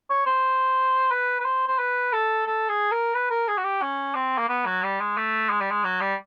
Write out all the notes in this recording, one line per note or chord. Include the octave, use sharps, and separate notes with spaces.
C#5
C5
B4
B4
C5
C5
B4
A4
A4
G#4
A#4
B4
A#4
G#4
F#4
G4
C#4
C4
A#3
B3
F#3
G3
G#3
A3
G#3
G3
G#3
F#3
G3